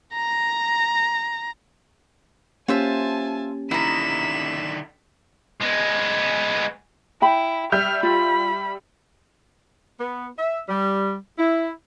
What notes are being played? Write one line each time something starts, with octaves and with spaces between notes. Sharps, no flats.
A#5 A#6
A#3 C#4 F4 G4 C5 E5 G#5 A5
D3 D#3 E4 A#5 B6 E7
G#3 B3
E4 G5 B5
G3 E5 F6 G6
F4 B5
B3
E5
G3
E4